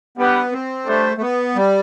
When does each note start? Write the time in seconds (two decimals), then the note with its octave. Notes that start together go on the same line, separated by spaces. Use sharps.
0.18 G3 B3 D4 G4 B4 F#5
0.52 C4
0.87 G3 A3 D4 A4 C5
1.17 A3
1.21 B3
1.56 G3